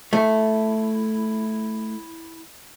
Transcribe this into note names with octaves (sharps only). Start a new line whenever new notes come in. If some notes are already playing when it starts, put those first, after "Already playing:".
A3 E4